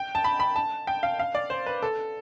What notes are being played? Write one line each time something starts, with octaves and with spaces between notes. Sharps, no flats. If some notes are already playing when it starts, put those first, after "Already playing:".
Already playing: G5
A5
B5
B5
A5
G5
F5
F5
D5
C5
B4
A4